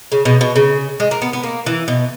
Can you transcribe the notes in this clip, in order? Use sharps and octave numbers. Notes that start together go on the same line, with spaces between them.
C#3
B2
B2
C#3
G#3
A#3
B3
B3
A#3
E3
B2